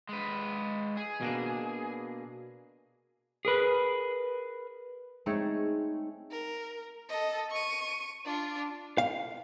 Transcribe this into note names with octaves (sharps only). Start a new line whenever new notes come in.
G#3 B4
G#4
B2 A#3 D4
G#4 A#4 B4
G#3 A3 C4 D#4 G#4 C#5
A#4
A4 D#5
C#6 D#7
D4 F4
F5